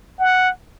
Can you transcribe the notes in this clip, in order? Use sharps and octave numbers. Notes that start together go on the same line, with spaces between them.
F#5